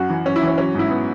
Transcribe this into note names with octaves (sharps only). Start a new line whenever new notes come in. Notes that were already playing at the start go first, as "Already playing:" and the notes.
Already playing: F#2 F#4
E3
F#2 C#4
E4
E3 C#4
F#3 C#4
G#2 E4
B3